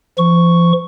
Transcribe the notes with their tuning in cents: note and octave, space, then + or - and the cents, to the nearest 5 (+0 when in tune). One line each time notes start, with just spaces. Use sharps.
F3 -35 C#6 +0